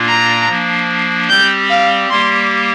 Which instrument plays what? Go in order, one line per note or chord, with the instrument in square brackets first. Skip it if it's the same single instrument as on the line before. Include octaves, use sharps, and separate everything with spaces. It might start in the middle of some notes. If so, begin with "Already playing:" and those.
Already playing: [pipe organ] A#2 A#3 D4 F4
[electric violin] A#5
[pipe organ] F3 A#3 D4
[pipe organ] G3 C4 G4 [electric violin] G6
[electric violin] F5
[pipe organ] G3 A#3 G4 [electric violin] C6